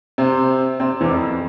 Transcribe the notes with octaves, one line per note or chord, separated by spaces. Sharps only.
C3 C4
C3 C4
E2 E3
F2